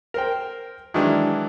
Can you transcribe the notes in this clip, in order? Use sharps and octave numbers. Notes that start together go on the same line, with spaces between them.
A#4 C5 G5
D#3 E3 F#3 G#3 D4